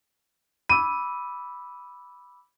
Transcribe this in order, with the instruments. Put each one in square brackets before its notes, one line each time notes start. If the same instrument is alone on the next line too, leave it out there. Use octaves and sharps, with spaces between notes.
[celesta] B5 D6 E6 [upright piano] D#7